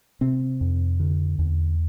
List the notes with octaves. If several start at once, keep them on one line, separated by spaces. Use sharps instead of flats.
C3 C4
F2
D3
E2